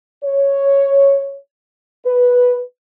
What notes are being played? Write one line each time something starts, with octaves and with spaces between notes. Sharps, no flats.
C#5
B4